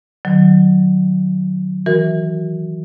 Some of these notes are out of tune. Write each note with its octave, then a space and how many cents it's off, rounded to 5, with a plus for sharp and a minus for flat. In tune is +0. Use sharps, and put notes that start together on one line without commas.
D#3 -40 F#3 +0
E3 -20 F#4 +0 A#4 +0